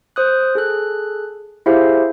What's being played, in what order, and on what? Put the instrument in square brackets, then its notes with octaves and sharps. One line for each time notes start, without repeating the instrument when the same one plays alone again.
[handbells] C5 D#6 F#6
G#4 A4 F#6
E4 G4 G#4 C5 E5 F5